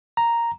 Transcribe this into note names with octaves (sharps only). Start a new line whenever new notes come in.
A#5